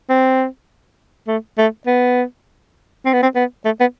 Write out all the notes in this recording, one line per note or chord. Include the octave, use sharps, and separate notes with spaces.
C4
A3
A3
B3
C4
B3
C4
B3
A3
B3